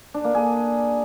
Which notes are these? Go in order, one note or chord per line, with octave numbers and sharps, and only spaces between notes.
D4
A#3
G#4